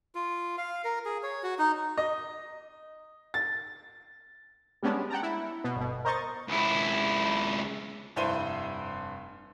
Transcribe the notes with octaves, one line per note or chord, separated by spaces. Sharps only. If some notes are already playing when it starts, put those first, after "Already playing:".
F4
F5
A#4
G#4
C#5
F#4
D#4
D#5
A6
G3 G#3 B3 C#4 D4
F#5 G5 A5 A#5
E4
B2
G1 B2
A#4 C5 D#5 C#6 A6
C#2 E4
F1 G2 E4 C5 D#7 G7